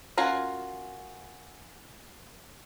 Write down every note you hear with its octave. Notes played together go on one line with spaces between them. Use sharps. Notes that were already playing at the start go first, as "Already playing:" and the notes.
C#4 F4 F#4 A#4